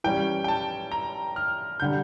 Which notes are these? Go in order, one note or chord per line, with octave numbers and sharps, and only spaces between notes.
E3 G3 C#4 G5
G5
A5
A#5
F6
D3 G3 G6